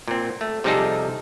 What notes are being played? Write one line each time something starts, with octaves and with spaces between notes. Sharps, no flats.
A#2 C4
A3
C3 F3 G3 D#4 G#4 A4